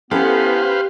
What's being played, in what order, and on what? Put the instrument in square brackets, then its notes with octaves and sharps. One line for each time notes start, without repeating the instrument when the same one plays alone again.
[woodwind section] B3 C#4 [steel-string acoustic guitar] E4 A4 [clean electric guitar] G4 [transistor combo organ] B4 C5 F5